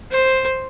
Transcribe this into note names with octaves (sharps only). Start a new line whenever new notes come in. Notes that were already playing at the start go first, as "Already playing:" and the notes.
C5